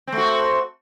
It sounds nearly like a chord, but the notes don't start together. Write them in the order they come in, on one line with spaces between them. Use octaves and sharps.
C4 A3 F#4